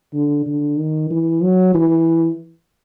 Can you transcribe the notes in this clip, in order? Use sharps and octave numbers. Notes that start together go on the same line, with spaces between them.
D3
D3
D#3
E3
F#3
E3